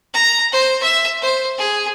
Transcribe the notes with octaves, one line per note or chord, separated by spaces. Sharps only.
A#5
C5
E5
C5
G#4